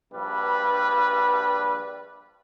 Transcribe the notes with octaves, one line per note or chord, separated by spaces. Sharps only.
A#1 G2 G3 B4